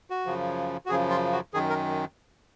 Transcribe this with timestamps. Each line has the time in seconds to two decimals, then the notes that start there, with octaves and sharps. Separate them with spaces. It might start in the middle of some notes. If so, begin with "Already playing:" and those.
0.10 F#4
0.26 F#2 C#3 F3
0.86 F#4
0.89 F#2 C#3 F3 G#4
1.10 F4
1.32 F#4
1.54 F#2 D#3 G#4
1.70 A#4